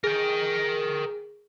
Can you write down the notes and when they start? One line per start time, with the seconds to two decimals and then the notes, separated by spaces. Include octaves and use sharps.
0.04 G#4 A#4 G5